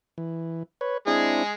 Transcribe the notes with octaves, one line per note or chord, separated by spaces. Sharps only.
E3
B4 C#5
G#3 C4 D4 E4 G#4